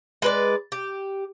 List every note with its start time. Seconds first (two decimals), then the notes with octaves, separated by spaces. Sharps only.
0.22 G#3 B4 D5
0.72 G4